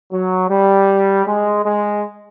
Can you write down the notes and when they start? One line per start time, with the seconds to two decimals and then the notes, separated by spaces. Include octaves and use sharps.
0.11 F#3
0.49 G3
1.26 G#3
1.64 G#3